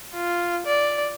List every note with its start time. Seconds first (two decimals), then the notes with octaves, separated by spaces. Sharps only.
0.14 F4
0.67 D5